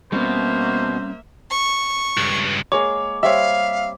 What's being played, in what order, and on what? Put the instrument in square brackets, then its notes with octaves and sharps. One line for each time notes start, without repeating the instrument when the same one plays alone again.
[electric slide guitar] B2 [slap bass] G3 C4 C#4 [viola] A#3 E5 [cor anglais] C5
[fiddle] C#6
[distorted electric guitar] C#2 G2
[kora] G#3 A#3 G#4 [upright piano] C#5 [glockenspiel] D6
[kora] G3 C4 C#5 [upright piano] E5 [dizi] F5